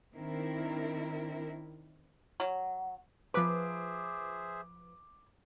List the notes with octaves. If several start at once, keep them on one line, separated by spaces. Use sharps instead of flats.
D#3 C4 D4 E4 A#4
F#3
F3 G#4 B4 C5 E5 D6